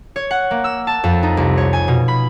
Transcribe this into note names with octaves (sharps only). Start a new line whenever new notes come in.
C#5
F#5
A#3
E6
A5
F2
D#4
C2
C#5
G#5
B2
B5